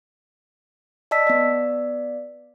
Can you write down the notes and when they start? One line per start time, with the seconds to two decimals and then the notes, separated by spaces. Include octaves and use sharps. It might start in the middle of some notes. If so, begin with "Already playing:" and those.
1.11 D5 D#5 A5 E6 B6
1.27 B3 D5